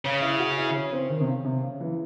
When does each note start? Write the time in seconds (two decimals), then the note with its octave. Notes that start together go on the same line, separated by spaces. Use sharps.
0.04 C#3 C#4
0.22 E4
0.39 F#4
0.57 E4
0.75 C#4
0.92 C4
1.10 D#3
1.21 C3
1.28 C#3
1.45 C3
1.63 C#3
1.80 E3